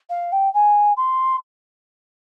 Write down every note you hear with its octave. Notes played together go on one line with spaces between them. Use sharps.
F5
G5
G#5
C6